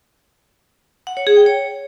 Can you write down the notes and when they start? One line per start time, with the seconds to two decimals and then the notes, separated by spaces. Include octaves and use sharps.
1.07 F#5
1.17 C#5
1.27 G#4
1.37 G5
1.46 C#5